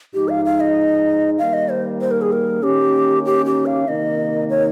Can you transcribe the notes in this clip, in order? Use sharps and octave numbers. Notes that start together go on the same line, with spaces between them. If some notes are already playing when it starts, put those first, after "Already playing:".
G#2 F3 G#3 D#4 G4
F5
F5
D#5
D#3 G3 A#3 F5
D#5
C5
C5
A#4
G#4
A#4
D#3 A#3 C#4 G4
G4
G4
F5
C3 D#3 A#3 D#4 D#5
C#5